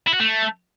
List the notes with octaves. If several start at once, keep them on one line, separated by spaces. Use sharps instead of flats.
E4
F#4
A3